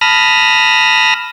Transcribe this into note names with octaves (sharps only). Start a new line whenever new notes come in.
A5 B5 D#6 F6 A#6